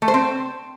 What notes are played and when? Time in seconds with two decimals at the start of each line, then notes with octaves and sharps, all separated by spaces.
0.02 A3
0.08 C5
0.14 C4